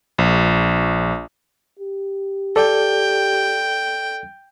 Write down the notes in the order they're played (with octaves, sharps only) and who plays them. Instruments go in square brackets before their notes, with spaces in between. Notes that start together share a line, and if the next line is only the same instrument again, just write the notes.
[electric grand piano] A#1
[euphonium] G4
[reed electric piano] A4 D5 [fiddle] G5